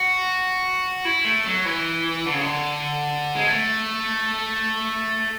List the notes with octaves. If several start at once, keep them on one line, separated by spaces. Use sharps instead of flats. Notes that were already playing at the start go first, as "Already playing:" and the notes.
Already playing: F#4
E4
A3
F#3
E3
D3
C#3
D3
G#3
A3